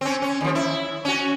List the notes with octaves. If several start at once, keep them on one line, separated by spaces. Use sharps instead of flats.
C4 C#4
C#4
D#2 F3
E4
C#4 F#4